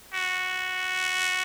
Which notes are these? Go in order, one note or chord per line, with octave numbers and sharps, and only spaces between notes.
F#4